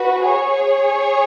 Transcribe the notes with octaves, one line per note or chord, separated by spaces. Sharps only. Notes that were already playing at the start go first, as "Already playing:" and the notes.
Already playing: F#4 B4
G#4 C#5